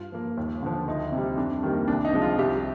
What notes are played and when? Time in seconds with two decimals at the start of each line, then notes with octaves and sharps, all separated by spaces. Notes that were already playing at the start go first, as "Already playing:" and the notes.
Already playing: G2 F4
0.12 F3 A#3
0.37 D#2
0.63 D3 F3
0.87 D2 D#4
1.12 C3
1.17 G3
1.37 F2 D4
1.63 D#3 G3 A#3
1.88 C2 D4
2.05 D#4
2.13 C3 F3 G#3
2.22 F4
2.38 C2 G4